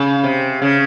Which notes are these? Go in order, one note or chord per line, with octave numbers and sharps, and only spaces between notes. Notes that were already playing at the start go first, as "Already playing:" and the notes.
Already playing: C#3
C3
C#3